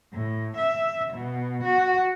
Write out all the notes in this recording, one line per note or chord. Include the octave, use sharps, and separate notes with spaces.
A2
E5
B2
F#4